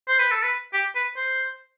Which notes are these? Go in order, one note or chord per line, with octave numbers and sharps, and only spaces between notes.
C5
B4
A4
B4
G4
B4
C5